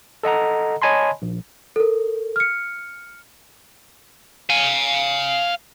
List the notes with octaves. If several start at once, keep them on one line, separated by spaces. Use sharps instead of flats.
A4 D#5 F#5 A#5
C#5 D#5 G#5 A5 B5 C6
A#1
A4 A#4
F6 C#7
F5 G#5